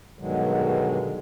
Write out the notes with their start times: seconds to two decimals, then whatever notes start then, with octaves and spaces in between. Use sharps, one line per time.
0.19 G2 B2 D3 D#3 F#3 G#3